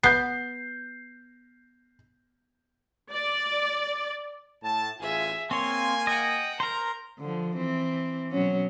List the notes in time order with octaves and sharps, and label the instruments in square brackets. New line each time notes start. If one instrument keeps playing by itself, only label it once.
[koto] B3 [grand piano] G6 C7
[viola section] D5
[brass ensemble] A2 A5
[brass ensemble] A1 F4 G#5 [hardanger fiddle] G#4 E5
[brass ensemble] A#3 F5 G#5 [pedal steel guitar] C4 C#5 [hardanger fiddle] C6
[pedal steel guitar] D#5 [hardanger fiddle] F#5 G5
[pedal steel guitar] A#4 C5 [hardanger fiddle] A#5
[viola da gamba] D3 F3
E3 C4
B2 F#3 C#4